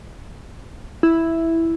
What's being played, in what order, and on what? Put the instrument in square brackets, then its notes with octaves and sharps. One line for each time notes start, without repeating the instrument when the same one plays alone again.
[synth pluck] E4